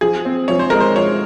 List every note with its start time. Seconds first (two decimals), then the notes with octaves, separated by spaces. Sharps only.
0.01 F3 G#4
0.25 C4
0.48 F3 C#5
0.59 C5
0.70 G#3 A#4
0.80 C5
0.95 F3 C#5